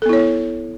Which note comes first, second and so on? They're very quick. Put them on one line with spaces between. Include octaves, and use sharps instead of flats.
A4 B3 E4 C#5